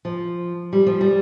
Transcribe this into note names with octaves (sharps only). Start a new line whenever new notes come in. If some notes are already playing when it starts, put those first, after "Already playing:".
F3
G3
F3
G3